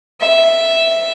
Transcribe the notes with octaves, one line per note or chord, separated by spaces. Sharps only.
E5